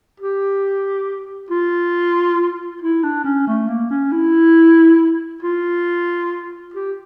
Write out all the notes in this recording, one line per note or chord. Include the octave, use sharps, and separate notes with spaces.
G4
F4
E4
D4
C#4
A3
A#3
C#4
E4
F4
G4